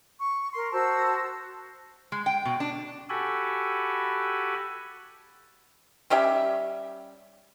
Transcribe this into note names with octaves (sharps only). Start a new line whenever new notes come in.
C#6
A#4 C6
F#4 C5 A5 E6
G#3
G5
B2
D4
F#4 G4 A4 G#5 B5
G3 C#4 G4 E5